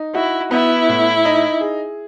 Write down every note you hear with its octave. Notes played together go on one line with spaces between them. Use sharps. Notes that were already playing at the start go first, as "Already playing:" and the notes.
Already playing: D#4
E4 F#4
B3 E4
A2
D#4
G#4